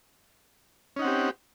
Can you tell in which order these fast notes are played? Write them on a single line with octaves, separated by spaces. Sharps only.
C#4 D#4 F#5 C4 G4